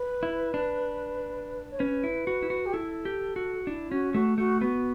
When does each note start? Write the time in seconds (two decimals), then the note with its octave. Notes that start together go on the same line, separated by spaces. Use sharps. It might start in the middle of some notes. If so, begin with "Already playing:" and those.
Already playing: B4
0.23 E4
0.54 D4
1.71 C#5
1.79 C#4 B4
2.04 E4
2.27 F#4
2.43 E4
2.50 F#4
2.66 G4
2.73 E4 A4
3.05 G4
3.36 F#4
3.67 D4 E4
3.91 C#4 F#4
4.14 A3 F#4
4.38 A3 F#4
4.61 B3 F#4